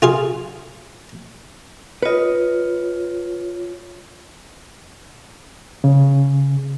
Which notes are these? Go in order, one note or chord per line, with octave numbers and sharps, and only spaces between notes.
F4 G#4 F5
F4 B4 C#5 D#5
C#3